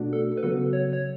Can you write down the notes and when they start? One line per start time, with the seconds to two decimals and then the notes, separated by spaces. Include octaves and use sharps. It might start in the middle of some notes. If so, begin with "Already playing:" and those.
Already playing: B2 A3 D4 F#4
0.13 A4
0.37 B4
0.43 C#3 F#3 B3 F#4 A4
0.73 C#5
0.93 C#5